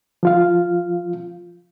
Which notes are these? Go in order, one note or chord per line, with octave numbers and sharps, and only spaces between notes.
F3 F4 F5